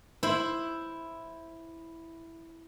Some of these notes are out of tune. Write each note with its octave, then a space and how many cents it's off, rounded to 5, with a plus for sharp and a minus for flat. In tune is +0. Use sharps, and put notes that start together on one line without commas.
E4 +0 C5 +0 B5 +0